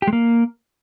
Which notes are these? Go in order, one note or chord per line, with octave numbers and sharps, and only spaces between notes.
G4
G#3
A#3